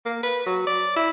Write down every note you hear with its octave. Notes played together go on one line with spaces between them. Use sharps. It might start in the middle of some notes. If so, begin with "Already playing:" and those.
A#3
B4
F#3
D5
E4